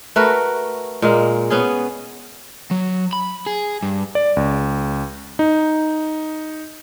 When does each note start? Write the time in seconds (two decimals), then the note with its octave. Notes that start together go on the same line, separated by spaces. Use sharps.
0.16 A3 F#4 A#4 B4
1.02 A#2 G#3 A#3
1.50 B3 C#4 G#4
2.71 F#3
3.13 B5
3.46 G#4
3.83 G2
4.15 D5
4.37 C#2
5.39 D#4